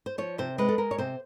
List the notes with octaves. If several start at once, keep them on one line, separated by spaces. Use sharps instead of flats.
C5
F3 C#5
C3 C5
G#3 B4
A4
G#3 A#4
C#5
C3 C5